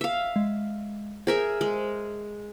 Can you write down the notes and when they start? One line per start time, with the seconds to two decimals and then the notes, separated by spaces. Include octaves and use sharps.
0.01 E5 F5
0.36 G#3
1.27 G#4 A#4 C5 E5
1.61 G#3